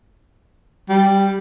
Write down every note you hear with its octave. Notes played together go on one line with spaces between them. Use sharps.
G3